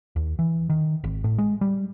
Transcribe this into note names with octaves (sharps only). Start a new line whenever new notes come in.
D#2
E3
D#3
G#1
A2
G#3
G3